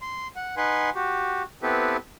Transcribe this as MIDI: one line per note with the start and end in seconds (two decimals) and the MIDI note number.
0.02 0.27 84
0.36 0.55 78
0.57 0.90 63
0.57 0.90 71
0.57 0.90 78
0.57 0.90 80
0.57 0.90 84
0.95 1.43 66
0.95 1.43 67
1.63 1.97 59
1.63 1.97 60
1.63 1.97 64
1.63 1.97 67
1.63 1.97 69
1.63 1.97 71